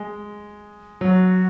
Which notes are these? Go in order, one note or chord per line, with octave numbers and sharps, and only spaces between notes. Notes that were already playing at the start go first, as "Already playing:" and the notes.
Already playing: G#3
F#3 F#4